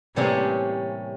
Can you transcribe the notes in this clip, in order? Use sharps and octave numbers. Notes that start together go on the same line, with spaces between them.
A2 C3 E3 G3 A#3 C#4